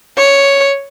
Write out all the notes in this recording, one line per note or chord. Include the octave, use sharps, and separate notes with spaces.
C#5